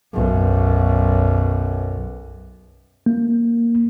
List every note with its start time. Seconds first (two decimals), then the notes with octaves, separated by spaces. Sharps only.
0.14 B1 F#2
3.06 A#3